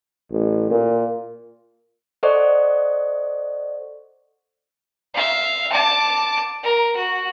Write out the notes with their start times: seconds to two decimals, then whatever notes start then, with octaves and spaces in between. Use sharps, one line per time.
0.32 A1
0.70 A#2
2.23 A4 C5 D5 D#5 F#5 C#6
5.14 E5 F5
5.72 A5 D6
6.63 A#4
6.96 F#4